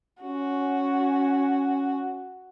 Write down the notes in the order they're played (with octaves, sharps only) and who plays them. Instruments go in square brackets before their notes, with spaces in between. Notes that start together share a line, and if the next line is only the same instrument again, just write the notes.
[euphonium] C#4 [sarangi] F#4